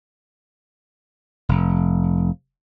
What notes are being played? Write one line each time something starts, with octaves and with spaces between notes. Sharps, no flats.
F1